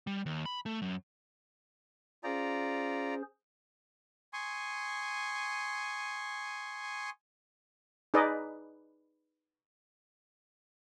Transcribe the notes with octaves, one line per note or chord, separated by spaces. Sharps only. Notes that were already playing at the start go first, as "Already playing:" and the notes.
G3
D#2
B5
A3
F#2
C#4 F4 G#4 C5 D5 A#5
G#5 C6 C#6 D#6
D#4 G#4 B4 D5 D#5